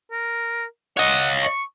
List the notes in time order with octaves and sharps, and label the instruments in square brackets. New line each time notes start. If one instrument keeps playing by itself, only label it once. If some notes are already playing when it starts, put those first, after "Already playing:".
[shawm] A#4
[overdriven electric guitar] C#5 D#5 [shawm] F#5
[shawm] C#6